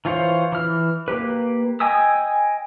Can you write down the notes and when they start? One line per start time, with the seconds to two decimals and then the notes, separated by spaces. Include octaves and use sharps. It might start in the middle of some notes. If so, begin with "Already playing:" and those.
0.05 E3 F4 C5 C#5
0.52 E3 F6
1.08 A#3 G4 B4
1.80 D#5 G5 G#5 D#6 E6